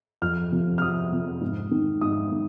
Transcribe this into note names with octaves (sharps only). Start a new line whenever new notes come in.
F2 F6
C3 F3
F6
F2 D#6
C3 F3
G#2
D#3
G#2 D#6
D#3